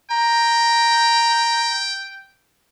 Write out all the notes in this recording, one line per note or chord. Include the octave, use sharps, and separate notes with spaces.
G5 A#5